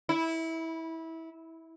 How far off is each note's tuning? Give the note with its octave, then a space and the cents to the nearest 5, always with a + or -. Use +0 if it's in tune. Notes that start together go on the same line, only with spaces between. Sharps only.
E4 -20